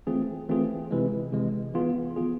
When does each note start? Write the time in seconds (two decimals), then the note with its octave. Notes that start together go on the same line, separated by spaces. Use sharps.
0.07 E3 A3 C4 F4 G#4
0.49 E3 A3 C4 F4 G#4
0.91 C3 E3 G#3
1.32 C3 E3 G#3
1.74 E3 B3 F4 G#4
2.16 E3 B3 F4 G#4